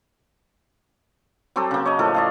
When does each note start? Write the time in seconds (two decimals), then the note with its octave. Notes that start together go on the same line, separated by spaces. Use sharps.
1.56 F#3 C4 G4 A4
1.71 C#3 A#3
1.85 C#5 D#5
1.99 A2 F3 A4 A#4
2.14 D5 D#5 F5